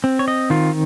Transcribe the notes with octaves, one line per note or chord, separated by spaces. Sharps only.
C4
C#5
D#5
D#3 F4